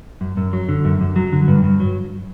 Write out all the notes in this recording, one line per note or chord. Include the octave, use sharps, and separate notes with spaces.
F#2
F#2
F#3
D3
F#2
F#2
F#3
D3
G2
G2
F#3